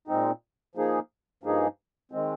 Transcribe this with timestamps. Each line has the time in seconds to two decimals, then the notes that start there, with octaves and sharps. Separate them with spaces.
0.08 A#2 G#3 C4 D#4
0.75 F3 A#3 D#4 G#4
1.43 G2 F3 A#3 D#4 G#4
2.12 D#3 G#3 C4